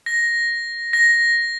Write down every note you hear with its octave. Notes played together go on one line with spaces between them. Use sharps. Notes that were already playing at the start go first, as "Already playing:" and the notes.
A#6
A#6